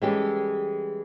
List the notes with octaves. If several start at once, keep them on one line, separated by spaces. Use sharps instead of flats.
E3 G3 G#3 C#4 G4 A4